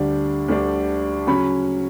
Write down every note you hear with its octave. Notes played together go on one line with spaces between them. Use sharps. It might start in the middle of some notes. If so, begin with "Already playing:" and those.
Already playing: D2 D3 G3 D4
D2 D3 G3 D4
C#3 F#3 C#4 B5